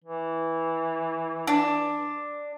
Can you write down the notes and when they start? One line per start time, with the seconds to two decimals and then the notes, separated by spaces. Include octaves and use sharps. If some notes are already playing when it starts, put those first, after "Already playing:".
0.04 E3
1.47 D4